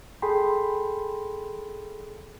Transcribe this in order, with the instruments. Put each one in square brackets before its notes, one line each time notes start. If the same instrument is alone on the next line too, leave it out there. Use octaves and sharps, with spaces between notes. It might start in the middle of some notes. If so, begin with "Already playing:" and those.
[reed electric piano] G#4 A4 G5 B5 C6